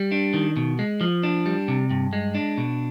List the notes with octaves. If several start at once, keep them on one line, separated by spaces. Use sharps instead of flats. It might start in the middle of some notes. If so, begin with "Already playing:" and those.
Already playing: G3
D4
D#3
B2
G#3
F3
D4
G3
C3
G2
G#3
D4
B2